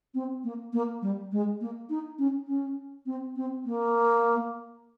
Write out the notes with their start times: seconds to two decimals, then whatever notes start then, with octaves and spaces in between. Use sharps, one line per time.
0.14 C4
0.44 A#3
0.73 A#3
1.02 G3
1.32 G#3
1.61 A#3
1.90 D#4
2.19 C#4
2.48 C#4
3.06 C4
3.36 C4
3.65 A#3